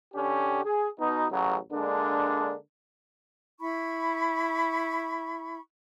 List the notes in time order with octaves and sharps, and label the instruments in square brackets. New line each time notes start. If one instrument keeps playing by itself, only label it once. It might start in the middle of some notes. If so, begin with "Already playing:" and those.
[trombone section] D3 C#4 G4
G#4
B2 D#4
A1 C#3 F#3
D3 G#3 A#3 D4
[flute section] E4 B5 C#6